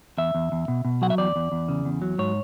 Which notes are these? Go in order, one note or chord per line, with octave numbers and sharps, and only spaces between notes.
E2 E5
E2
E2
B2
B2
F#3 F#5
E5
E2 D5
E2
E2
C#3
E2
F#3
G#2 C#5